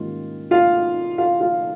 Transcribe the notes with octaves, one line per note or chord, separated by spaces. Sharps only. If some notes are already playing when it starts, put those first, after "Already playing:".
Already playing: G#2 D#3 G3 A#3 C#4 F4
F4 F5
F4 F5
F4 F5